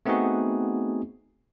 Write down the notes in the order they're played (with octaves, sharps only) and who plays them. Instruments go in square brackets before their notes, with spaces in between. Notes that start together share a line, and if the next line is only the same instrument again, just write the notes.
[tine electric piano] A3 B3 C4 D#4 F#4 G#4